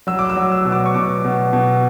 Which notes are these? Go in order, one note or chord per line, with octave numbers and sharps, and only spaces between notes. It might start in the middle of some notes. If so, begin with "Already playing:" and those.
F#3 E6
D6
E6
F#3
E6
B2
D6
C#6
B2 D6
B2
B2